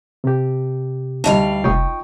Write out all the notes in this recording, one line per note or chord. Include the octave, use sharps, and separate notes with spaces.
C3 G4
D2 G3 D#4 D#5 F5 B5
F1 F4 G5 C#6 D#6